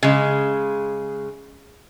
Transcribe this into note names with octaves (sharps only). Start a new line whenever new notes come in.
C#3 G#3